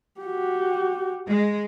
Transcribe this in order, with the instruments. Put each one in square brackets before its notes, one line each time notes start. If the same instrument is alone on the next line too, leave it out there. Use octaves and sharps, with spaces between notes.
[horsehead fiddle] F#4 G4
[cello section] G#3